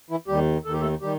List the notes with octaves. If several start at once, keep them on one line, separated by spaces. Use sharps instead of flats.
E3 E4
D#2 D#3 G3 G4
D#2 D#3 A4
G4
A3 A4
D#3 G3 G4